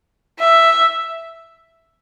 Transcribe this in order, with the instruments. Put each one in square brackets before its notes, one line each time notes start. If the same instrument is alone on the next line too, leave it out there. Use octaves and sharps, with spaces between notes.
[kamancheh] E5